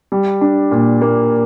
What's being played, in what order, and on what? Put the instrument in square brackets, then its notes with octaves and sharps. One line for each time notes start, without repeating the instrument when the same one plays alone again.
[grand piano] G3
D4
A#2
A#3